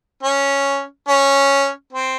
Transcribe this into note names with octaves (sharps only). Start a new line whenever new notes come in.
C#4
C#4
C4